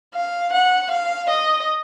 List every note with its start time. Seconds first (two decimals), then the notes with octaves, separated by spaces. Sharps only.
0.15 F5
0.53 F#5
0.91 F5
1.30 D#5